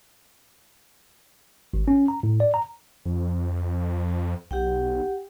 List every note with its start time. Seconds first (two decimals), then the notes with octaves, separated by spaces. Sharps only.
1.74 G#1
1.88 C#4
2.08 A#5
2.23 A2
2.40 D5
2.54 A#5
3.05 F2
4.51 B1 G4 F#5 G5